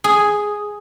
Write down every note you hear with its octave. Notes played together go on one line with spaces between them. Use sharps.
G#4